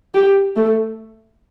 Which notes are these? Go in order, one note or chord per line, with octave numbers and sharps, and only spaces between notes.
G4
A3